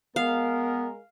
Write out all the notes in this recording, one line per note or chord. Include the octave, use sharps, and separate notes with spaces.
G#3 B3 A#4 F5